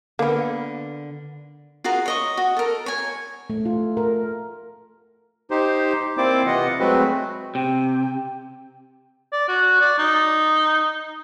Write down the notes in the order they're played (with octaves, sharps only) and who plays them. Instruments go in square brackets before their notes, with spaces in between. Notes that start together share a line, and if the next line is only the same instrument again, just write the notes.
[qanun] D3 A#4 [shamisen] A#3 B3
[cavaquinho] F4 F#4 G#4 A#4
C#5 D#5 C#6
F#4
A4 A#4
C#5 G#5
[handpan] A3
F4
A#4
[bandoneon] D#4 G4 C5
A#3 C4 E4 C5 D5 D6
C3 E3 F4 D#5 F#5
F#3 G#3 A3 C4 F#4 B4
[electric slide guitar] C3 [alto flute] G5
[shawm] D5
F#4
D5
D#4